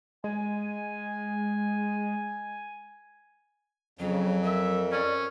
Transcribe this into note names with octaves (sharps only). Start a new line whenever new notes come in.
G#3 G#5
F2 C#3 F#3
F#3 A#4 E5
C#4 D5